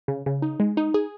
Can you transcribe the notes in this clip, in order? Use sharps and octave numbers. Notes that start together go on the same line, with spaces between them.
C#3
C#3
D#4
G#3
D#4
G#4